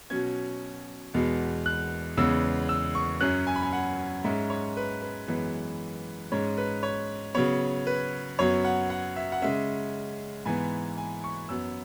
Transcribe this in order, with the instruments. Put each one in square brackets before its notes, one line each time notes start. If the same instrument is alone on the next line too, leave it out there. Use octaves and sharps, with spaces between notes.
[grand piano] B2 F#3 C#4 G#6
E2 B2 G#3 B3
F#6
E2 C#3 G#3 B3 E6
E6
C#6
F#2 F#3 C#4 F#6
G#5
B5
G#5
F#5
G#2 G#3 C#4 E5
C#5
B4
B4
F#2 E3 G#3 B3
G#2 G#3 C#4 C#5
B4
C#5
C#3 F#3 B3 C#5
B4
F#2 F#3 B3 C#5
F#5
F#5
E5
F#5
C#3 G#3 C#4 E5
G#2 E3 B3 G#5
G#5
C#6
F#2 F#3 B3 E6